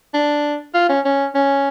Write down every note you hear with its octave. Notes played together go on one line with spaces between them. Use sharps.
D4
F4
C#4
C#4
C#4